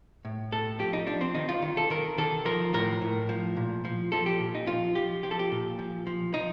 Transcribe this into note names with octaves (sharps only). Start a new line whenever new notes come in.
A2
A2 A4
F3 G4
D#4
F3 D4
C4
D#3 D#4
F4
D#3
A4
D#3 A#4
D#3 A4
F3 A#4
A2 A#4
A2
F3
A#2
F3
F3 A4
G4
A#2
D#4
F3 F4
F3 G4
F3 G4
A4
G4
A#2
F3
F3
F3 D#4